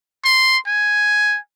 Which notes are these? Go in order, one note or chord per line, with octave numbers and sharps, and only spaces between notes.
C6
G#5